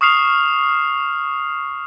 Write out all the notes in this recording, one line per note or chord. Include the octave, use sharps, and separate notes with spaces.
C#6 D#6 F6 C7 F7